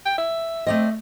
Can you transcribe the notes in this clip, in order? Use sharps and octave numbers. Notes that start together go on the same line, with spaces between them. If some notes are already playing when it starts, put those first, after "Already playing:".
G5
E5
A3 C4 D5 D#5